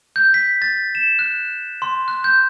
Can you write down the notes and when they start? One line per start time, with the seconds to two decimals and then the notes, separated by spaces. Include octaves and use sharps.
0.16 G6
0.34 B6
0.62 A6
0.95 E7
1.19 F#6
1.82 C6
2.08 F#6
2.24 G6